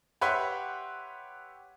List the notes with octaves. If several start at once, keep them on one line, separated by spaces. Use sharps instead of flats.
G4 B4 C#5 E5 F#5 C6